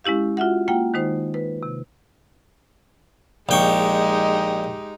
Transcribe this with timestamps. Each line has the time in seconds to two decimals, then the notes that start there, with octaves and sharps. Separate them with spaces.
0.04 G#3 C#4 E4 G4 F5
0.37 F4 F#4 E5 F#5
0.68 A#3 F4 F#5 G5
0.94 D#3 G#3 D#4 C5
1.34 B4
1.63 C3
3.49 A#1 G#3 D#4 G4 G5 C#6